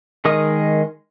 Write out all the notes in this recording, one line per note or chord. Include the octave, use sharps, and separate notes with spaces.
D#3 G#3 A#4 D#5 D#6